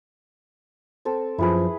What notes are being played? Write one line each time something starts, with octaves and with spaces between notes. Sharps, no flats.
C4 A4
F#2 F3 E4 G#4 B4